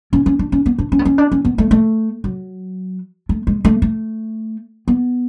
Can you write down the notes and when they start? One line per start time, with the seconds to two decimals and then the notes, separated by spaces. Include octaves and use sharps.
0.13 C#4
0.26 C#4
0.39 D4
0.52 C#4
0.66 B3
0.79 D4
0.92 C#4
0.99 B3
1.05 C#4
1.18 D4
1.32 C#4
1.45 B3
1.58 A3
1.71 A3
2.24 F#3
3.29 A3
3.47 G#3
3.65 A3
3.82 A3
4.88 B3